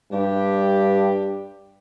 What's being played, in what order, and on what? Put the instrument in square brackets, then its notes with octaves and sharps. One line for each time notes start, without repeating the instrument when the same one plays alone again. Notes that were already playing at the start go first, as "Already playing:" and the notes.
[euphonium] G2 [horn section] D4 G4